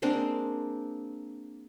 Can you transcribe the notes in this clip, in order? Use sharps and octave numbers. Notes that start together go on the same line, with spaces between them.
G#3 A#3 C4 D4